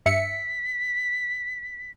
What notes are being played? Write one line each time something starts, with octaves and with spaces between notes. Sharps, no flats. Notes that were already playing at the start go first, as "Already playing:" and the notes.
G2 E5 B6 C#7